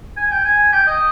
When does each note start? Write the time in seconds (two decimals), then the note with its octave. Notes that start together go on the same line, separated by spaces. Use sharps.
0.17 G#5
0.31 G5
0.45 G#5
0.73 G5
0.87 D#5